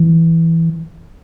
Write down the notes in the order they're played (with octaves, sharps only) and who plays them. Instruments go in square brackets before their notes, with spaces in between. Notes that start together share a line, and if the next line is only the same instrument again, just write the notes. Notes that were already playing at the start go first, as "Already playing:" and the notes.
Already playing: [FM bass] E3